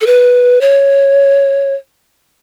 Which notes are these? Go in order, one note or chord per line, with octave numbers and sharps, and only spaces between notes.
A4
B4
C#5